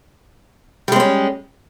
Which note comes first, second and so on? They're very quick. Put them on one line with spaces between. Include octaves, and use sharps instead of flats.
G3 G#3 C4 C#4